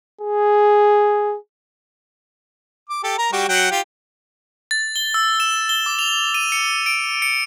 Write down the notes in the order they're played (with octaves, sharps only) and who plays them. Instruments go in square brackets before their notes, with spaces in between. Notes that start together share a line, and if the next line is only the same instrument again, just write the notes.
[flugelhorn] G#4
[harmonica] D6
G4 A4
A#4 A#5
G3 F#4 G4
F#3 F#5 G5
F4 G4
[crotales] A6
G7
E6
E7
G7
D6
F7
D#7
C#7
D7
C#7